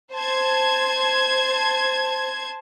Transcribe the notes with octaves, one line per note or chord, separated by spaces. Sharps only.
C5 A5 G#6